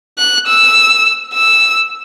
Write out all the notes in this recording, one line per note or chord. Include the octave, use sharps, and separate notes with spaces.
F#6
E6
E6